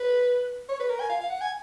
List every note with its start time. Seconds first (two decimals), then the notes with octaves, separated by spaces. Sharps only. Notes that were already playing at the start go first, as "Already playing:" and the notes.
Already playing: B4
0.69 C#5
0.80 B4
0.90 A#4
1.00 G#5
1.09 F5
1.21 F5
1.30 F#5
1.41 G#5